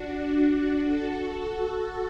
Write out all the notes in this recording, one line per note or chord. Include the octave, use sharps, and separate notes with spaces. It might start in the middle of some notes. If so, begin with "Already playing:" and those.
Already playing: D4 F#4
F#4 A4